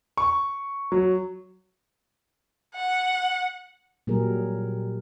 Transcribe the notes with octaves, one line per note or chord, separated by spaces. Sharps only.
C#6
F#3
F#5
A#2 F#3 G3 G4 G#4 A#4